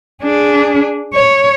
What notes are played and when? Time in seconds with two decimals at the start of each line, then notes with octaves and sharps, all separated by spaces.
0.23 D4 G#4
1.14 C#5